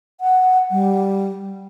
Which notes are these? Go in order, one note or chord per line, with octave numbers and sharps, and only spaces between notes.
F#5
G3